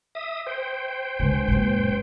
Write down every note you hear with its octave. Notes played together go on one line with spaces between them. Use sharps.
E5 D#6
C5 G5
C2 D3 G#3 B4
F#2 A#2